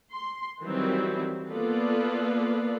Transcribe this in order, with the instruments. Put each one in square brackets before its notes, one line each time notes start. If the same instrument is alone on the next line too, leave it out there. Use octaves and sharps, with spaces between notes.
[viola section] C6
D#3 E3 F#3 G3 C4 E4
A#3 B3 F4 A4 B4 D5